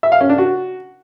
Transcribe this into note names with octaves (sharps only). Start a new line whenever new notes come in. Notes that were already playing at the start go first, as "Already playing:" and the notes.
E5
F5
C#4
D4
F#4